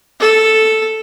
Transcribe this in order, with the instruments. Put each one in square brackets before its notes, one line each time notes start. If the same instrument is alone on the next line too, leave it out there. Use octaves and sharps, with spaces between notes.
[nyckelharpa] A4